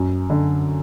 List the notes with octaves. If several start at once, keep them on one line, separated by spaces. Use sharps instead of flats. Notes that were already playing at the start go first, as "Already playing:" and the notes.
Already playing: F#2
D3